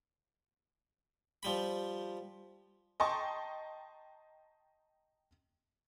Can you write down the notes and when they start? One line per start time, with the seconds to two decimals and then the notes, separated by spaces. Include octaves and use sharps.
1.43 F3 G3 B5
3.00 D#5 G5 A5 A#5 C6 C#6